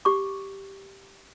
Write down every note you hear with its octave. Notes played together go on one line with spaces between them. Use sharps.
G4 C#6 D6